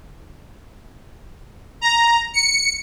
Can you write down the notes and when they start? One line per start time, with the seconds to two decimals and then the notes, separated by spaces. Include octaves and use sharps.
1.81 A#5
2.33 C#7